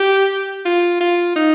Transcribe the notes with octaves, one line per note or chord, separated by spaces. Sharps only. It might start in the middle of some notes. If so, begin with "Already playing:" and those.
Already playing: G4
F4
F4
D#4